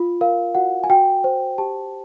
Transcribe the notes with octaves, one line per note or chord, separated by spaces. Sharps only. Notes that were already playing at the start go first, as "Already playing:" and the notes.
Already playing: F4
A#4 F5
F#4 F#5
G#5
F#4 G5
C5
G4 A5